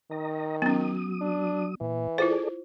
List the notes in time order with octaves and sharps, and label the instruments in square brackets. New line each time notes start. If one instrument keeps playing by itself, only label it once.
[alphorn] D#3 [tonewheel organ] D#5 A#5
[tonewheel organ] F#3 D#6 [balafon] B3 C#4
[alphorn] D4
[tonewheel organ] A#2 [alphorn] E3
[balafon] E4 F4 C5 [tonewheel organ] G#4 A4 D5